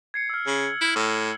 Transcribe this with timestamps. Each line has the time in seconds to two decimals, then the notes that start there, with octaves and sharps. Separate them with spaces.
0.14 G#6 C7 C#7
0.30 E6 F6
0.47 C#3 C7 F#7
0.81 E4
0.96 A2 E6 F6